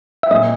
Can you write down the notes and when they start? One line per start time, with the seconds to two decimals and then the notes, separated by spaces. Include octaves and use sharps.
0.23 E5
0.31 A#2 D#5